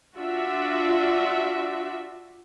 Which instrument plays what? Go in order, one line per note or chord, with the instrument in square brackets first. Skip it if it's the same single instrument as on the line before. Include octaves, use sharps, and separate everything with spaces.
[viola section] D4 F4 F#4 E5